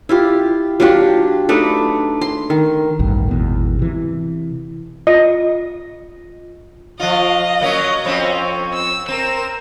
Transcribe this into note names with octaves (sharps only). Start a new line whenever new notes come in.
E4 F4 G4
F#3 D4 F4 G4
A3 D4 D#4 B4
C6
D#3
A1 D2 G2
G#1 E2 B2
C3 E3
F4 D#5
F3 F4 D#5
F#3 A#3 C#4
F2 C4 C#4
E6
C4 A#4 E7